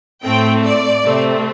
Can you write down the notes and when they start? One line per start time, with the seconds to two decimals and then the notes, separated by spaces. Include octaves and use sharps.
0.24 A2 A3 C4 G5
0.63 D5
1.03 C3 A3 C4